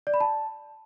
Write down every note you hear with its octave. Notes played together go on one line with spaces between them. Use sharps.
D5
B5
A5